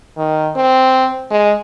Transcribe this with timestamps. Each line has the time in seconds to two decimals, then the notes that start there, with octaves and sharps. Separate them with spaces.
0.17 D#3
0.56 C4
1.31 G#3